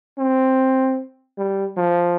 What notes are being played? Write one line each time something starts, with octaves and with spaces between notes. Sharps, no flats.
C4
G3
F3